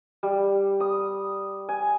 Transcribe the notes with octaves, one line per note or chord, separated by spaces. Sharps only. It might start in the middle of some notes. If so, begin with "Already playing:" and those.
G3
D#6
G#5